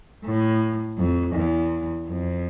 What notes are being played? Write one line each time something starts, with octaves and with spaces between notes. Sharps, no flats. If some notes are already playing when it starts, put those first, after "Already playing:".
A2
F2
E2
F2